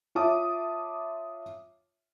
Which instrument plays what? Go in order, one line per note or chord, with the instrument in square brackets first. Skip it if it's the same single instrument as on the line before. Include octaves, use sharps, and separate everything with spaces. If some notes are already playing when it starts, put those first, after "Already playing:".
[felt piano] F4 C#5 E5 A5 D6 D#6